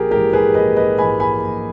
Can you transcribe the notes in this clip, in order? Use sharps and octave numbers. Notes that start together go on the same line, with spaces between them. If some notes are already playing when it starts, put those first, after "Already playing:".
Already playing: A#1 G4 G#4 A#4
G#2 E3 G#3 G4 A#4
G#4 B4
A#1 B4 D#5
B4 D#5
G#2 E3 G#3 G#5 B5
G#5 B5
A#1